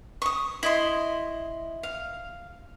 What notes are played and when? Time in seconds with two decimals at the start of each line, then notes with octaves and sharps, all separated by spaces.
0.22 C#6 D#6
0.63 E4 D#5 C6
1.83 F5